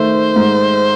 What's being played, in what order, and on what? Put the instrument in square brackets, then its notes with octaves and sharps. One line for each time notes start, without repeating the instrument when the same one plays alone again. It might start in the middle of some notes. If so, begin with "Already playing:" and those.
Already playing: [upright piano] D#3 A3 [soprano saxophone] C5
[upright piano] G#2